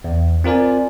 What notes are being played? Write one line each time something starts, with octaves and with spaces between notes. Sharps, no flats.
E2
C4 F4 A#4 D5 G#5